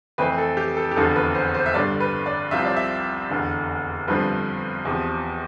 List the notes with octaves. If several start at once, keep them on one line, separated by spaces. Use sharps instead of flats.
F2 E3 A3 C4 B4
A4
G4
A4
G4
F1 E2 D3 F3 A4
B4
C5
C5
E5
G1 G2 D3 D5
B4
D5
C2 C3 F3 C4 F4 E5
D5
E5
F1 E2 D3
G1 G2 D3 F3 C4 B4
E2 C3 F3